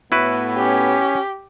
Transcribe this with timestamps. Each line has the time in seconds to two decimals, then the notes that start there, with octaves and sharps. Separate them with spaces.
0.12 A2 B3 E4 F#4 B4
0.57 C#4 G4